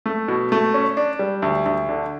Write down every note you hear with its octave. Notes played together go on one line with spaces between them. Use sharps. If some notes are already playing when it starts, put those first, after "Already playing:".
A3
B2
A3
C#4
D4
G3
D2
D2
D3